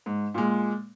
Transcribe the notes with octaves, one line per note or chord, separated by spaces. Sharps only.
G#2
A#2 G#3